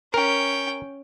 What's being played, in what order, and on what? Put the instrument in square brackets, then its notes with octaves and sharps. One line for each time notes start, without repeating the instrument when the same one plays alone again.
[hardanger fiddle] C#4 G5 [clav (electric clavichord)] A#4